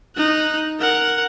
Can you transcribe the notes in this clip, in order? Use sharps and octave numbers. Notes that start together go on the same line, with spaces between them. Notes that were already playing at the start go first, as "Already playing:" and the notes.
D#4 F#6
A#4 F#5